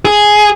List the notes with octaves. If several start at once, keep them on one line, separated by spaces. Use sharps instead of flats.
G#4